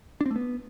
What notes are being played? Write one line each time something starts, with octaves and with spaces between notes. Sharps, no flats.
D4
C4
A3
B3